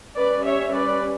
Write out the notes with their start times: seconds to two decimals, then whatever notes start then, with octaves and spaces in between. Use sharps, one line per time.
0.16 G3 C#4 B4 D5
0.44 C#5 E5
0.73 B4 D5